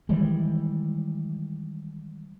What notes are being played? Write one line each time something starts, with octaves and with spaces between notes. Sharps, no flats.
D#3 E3 G3 G#3